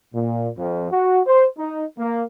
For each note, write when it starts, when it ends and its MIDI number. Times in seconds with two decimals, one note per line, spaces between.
0.14 0.48 46
0.57 0.87 41
0.91 1.21 66
1.27 1.46 72
1.58 1.84 63
1.98 2.24 58